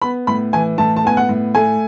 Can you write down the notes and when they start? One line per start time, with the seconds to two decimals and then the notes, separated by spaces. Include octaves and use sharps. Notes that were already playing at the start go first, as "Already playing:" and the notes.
0.02 B3 B5
0.27 A2 B5
0.53 E3 G#5
0.78 A2 A5
0.96 A5
1.05 B3 G#5
1.17 F#5
1.29 A2
1.55 A3 G#5